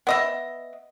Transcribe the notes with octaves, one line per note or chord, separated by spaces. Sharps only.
B3 D#5 E5